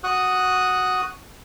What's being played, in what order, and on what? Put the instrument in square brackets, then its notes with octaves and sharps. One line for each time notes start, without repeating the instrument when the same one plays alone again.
[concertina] F#4 C#6 D#6 F#6